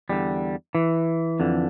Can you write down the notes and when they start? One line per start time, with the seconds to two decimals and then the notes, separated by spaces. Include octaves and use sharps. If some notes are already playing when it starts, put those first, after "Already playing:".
0.09 E2 D3 G3
0.75 E3
1.40 F2 D3